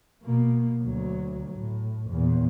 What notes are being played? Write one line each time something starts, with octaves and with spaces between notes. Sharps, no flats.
B2 A#3
D2 F#3
A2
E2 A#2